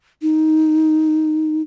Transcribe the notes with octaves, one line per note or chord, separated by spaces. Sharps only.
D#4